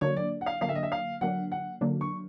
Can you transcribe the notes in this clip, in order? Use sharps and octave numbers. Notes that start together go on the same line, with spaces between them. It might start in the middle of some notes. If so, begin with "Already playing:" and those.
D3 F#3 A#3 D4 C#5
D5
F#5
F5
D3 F#3 A#3 D4 F5
E5
D#5
E5
F5
D3 F#3 A#3 D4 F#5
F#5
D3 F#3 A#3 D4
C#6